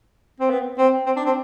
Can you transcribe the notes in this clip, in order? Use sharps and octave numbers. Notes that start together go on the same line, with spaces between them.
C4
B3
C4
C4
D4
C4